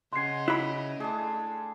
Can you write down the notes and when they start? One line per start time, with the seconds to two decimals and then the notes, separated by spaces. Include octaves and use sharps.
0.13 C#3 D#5 F#5 G#5 C6 C7
0.48 E4 B5 F#6
1.00 G#3 A3 D4 G#4